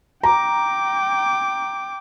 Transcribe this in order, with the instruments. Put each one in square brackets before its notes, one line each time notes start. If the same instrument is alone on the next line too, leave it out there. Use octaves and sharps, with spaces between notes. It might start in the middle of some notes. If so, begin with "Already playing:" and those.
[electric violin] G5 D6 [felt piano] A#5